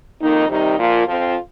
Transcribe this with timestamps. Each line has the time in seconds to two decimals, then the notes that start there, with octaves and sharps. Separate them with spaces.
0.21 F2 D#3 A#3 D#4
0.49 C3 D#3 G3 D#4
0.78 A#2 F3 A#3 F4
1.07 F2 F3 C4 F4